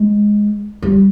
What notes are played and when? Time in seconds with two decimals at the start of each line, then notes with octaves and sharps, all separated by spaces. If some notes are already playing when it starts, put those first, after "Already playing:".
Already playing: G#3
0.82 G3